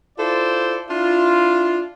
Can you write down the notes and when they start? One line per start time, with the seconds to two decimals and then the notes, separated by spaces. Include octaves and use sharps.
0.18 E4 F4 A4 C5 D5
0.89 D4 E4 F4